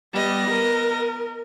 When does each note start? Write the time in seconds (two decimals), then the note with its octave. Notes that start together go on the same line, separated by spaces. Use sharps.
0.13 G3 B3 D#5
0.50 A#4